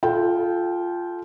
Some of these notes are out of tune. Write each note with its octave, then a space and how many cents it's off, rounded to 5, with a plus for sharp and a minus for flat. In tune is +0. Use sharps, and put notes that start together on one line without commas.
F4 +0 A4 -30 G5 +0